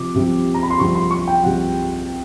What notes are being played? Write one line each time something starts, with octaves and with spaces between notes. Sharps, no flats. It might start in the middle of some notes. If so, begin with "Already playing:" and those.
Already playing: C3 F3 D6
C2 C3 F3
A#5
B5
C6
C2 C3 F3 C#6
C6
C#6
G5
C2 C3 F3 F#5